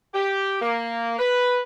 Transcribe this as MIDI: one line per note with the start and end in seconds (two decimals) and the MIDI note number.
0.14 0.59 67
0.61 1.17 58
1.19 1.60 71